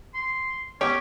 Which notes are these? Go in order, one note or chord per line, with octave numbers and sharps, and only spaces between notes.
C6
B3 C#4 G4 C#5